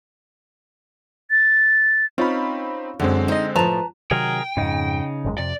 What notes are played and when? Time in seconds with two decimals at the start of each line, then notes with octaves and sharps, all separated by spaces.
1.31 A6
2.18 C4 C#4 D#4 F4 B5
3.00 F#2 D3 G#3 C4
3.28 D#4 C5 D#5
3.56 A2 F3 B4 A5 A#5
4.11 C3 D#3 F#3 G#4 A#4 G5
4.57 F2 G#2 C#3 D#4
5.25 G#1 F#2 G#3
5.38 F2 C3 D5